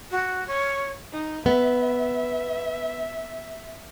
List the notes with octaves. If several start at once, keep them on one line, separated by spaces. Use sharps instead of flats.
F#4
C#5
D#4
B3 E5